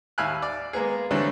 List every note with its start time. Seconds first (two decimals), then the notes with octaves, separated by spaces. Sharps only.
0.18 D#2 E5 F5 G#5 B5 F#6
0.42 D5
0.73 G#3 A#3 B3 G#4
1.11 D3 E3 F#3 G3 A3 C4